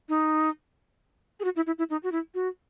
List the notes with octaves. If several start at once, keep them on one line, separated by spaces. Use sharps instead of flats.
D#4
G#4
F#4
E4
E4
E4
D#4
F#4
E4
F#4